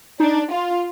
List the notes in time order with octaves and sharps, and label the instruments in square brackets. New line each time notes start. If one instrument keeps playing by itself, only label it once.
[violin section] D4 [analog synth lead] D#4
[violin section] F4